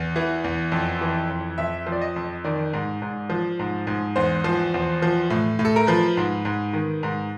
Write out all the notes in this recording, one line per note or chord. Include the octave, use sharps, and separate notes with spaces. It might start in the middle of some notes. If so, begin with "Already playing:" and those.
Already playing: E2
E3
E2
F2
E3
F2
F2 E5
F3
D5
D#5
F2
D#3 D5
G#2
G#2
F3
G#2
G#2
E2 C5
F3
E2
F3
A2
A2
A4
A#4
F3 B4
G#2
G#2
D#3
G#2